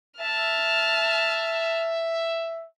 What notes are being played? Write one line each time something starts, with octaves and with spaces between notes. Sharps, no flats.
E5 A5 F6